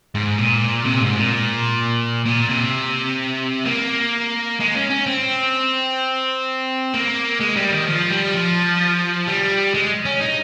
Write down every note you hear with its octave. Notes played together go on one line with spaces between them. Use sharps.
G#2
A#2
C3
G#2
A#2
A#2
C3
A#3
G#3
C#4
C#4
C4
A#3
G#3
G3
D#3
F3
G3
F3
G3
G#3
C#4
D#4